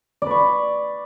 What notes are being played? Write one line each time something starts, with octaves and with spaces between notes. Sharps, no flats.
B4 D5 C#6